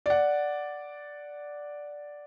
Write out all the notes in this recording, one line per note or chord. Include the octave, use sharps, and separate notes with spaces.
D5 F#5